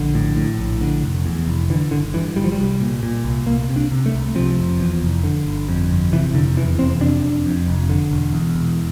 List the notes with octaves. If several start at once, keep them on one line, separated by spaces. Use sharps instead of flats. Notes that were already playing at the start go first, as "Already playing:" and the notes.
Already playing: A#1 D3
A2
A2
A#1
D3
F1
E2
F1
D3 E3
G1 D3
G2 E3
G1 G3
F3
G3
C2
A#2
A#2
C2
C2 A#3
C3
D4
C3
A3
C2
C3 F3
F1
E2
F1
D3
G1
F2
G1
C3 E3
F1 D3
E2 E3
F1 C4
C3 D4
F1
F2
F1
D3
E1
E2
E1